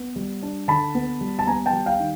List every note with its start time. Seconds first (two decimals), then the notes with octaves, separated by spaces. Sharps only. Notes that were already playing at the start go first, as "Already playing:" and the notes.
Already playing: B3
0.16 G3
0.42 D4
0.68 D3 A5 B5
0.95 B3
1.21 G3
1.39 A5
1.47 B3 G#5 A#5
1.66 G5 A5
1.73 G3
1.86 F5 G5
2.00 D#3